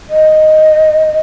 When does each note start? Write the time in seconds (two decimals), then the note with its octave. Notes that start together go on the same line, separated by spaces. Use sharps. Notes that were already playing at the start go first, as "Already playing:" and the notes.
0.10 D#5